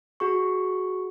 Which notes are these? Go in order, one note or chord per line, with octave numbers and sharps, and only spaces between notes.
F#4 G#4 C#6